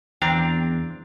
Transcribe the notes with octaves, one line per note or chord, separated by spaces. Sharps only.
E2 C4 D4 F5 G5 A#5